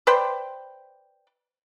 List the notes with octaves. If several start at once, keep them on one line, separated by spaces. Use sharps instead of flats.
B4 C5 D5 G5